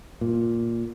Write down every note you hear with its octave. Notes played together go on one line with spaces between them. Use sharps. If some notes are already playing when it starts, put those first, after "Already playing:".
A#2